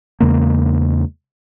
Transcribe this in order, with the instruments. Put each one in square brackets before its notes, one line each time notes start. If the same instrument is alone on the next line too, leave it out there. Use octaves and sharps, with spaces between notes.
[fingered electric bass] E2 C#3 G#3 A#3